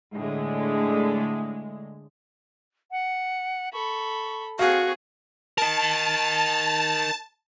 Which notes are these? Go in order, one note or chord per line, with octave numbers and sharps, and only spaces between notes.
A2 D3 G#3
F#5
A4 B5 C#6
C4 F#4 G#4 F5 C#6
A#4 D#5 A5